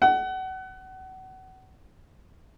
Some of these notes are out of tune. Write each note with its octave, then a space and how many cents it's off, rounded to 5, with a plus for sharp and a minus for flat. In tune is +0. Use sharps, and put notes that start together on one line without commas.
F#5 +30